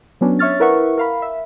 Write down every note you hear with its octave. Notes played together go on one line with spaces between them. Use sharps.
F#3 B3 C#4 D4
C#5 E5 C#6 F6 A6
E4 A#4 B4 E5 F#5 C#6
A#4 F5 B5
E5